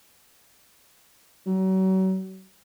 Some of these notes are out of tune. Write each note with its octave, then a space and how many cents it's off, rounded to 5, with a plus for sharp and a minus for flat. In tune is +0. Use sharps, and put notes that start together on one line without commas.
F#3 +35